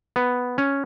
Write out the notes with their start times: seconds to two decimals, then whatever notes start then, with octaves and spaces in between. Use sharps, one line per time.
0.16 B3
0.58 C#4